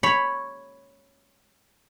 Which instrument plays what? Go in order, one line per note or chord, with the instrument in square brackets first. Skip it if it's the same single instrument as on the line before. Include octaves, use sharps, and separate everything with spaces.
[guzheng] C#5 B5